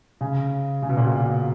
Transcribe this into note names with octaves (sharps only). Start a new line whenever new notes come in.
C#3
C#3
B2
A#2
B2